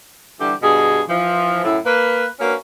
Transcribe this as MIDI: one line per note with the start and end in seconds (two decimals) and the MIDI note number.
0.40 0.54 50
0.40 0.54 52
0.40 0.54 55
0.40 0.54 67
0.62 1.02 43
0.62 1.02 47
0.62 1.02 68
1.08 1.62 52
1.08 1.62 53
1.64 1.77 42
1.64 1.77 45
1.64 1.77 64
1.86 2.26 58
1.86 2.26 71
2.40 2.54 58
2.40 2.54 61
2.40 2.54 62
2.40 2.54 66
2.40 2.54 71